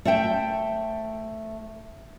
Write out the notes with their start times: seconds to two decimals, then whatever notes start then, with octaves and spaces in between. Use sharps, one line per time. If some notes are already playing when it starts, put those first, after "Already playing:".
0.05 A3 C5 E5 G5